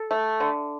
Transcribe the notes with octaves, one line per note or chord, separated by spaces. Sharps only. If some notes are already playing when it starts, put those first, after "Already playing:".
Already playing: A4
A3
D3